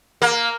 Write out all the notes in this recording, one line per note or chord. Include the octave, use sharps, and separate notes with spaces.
A#3